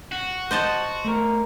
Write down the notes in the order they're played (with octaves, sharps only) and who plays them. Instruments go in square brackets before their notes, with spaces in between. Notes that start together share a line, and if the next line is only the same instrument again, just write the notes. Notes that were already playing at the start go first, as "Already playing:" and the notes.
[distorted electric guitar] F#4
[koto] C5 D#5 A5
[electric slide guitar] A3 A#4